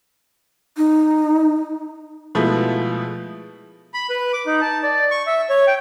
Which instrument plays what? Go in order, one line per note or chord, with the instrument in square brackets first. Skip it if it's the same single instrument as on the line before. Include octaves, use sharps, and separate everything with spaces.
[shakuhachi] D#4
[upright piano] B2 F3 G#3 A3 B3 E4
[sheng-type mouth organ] B5
B4
D6
D#4
A5
D5
C#6
E5
C#5
G5